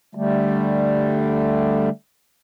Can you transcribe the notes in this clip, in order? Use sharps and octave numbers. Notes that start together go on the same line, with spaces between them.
D3 G3 A3